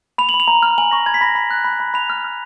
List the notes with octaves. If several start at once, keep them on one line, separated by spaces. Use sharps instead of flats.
B5 F7
F#7
B5
F7
A#5
F6
G#5 F#7
C#6 A#6
B5 G#6
B6
B5 A#6
B5 B6
F#6
B5
B5
B5 F7
F6
F6